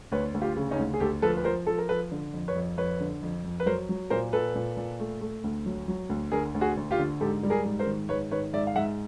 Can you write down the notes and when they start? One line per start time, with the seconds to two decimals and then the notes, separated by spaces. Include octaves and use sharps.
0.12 D2 B4 C#5
0.34 D2
0.41 F4 G4
0.56 C#3
0.71 C#4 D#4
0.79 D2
0.94 G#4
1.00 D2 G4 A4
1.22 F3 A4 B4
1.37 B4
1.45 F3 A#4 C5
1.67 F3 A4
1.78 A#4
1.89 F3 A4 B4
2.12 D3
2.34 F2
2.48 B4 C#5
2.55 F2
2.77 F2 B4 C#5
3.00 D3
3.22 F2
3.44 F2
3.60 B4
3.66 F#3 A#4 C5
3.89 F#3
4.10 A#2 A#4 C5
4.33 A#2 A4 B4
4.55 A#2
4.77 A#2
5.00 A3
5.21 A3
5.44 D2
5.66 F#3
5.88 F#3
6.10 D2
6.32 D3 G#4 A#4
6.54 D2
6.61 F#4 G#4
6.77 D2
6.91 F4 G4
6.99 D3
7.21 G#2 G4 A4
7.43 G3
7.50 G#4 A#4
7.65 G#2
7.79 A#4 C5
7.87 D#3
8.09 G#2 B4 C#5
8.31 D#3 B4 C#5
8.53 G#2 D5 E5
8.67 F5
8.76 G#2 E5 F#5